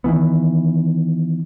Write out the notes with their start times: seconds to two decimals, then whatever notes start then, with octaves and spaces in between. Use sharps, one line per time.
0.04 D#3 E3 B3